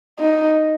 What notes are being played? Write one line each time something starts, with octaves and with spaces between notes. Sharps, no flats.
D#4